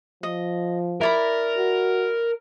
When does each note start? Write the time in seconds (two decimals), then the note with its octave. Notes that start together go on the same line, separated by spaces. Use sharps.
0.23 F3 D#5
1.01 E4 A#4 D5 B5
1.58 F#4